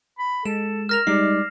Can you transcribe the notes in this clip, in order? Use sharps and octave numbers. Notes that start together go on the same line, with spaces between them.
B5
G#3 A4 E7
A#4 F6 A#6 F7
G3 G#3 D#4 D5 C7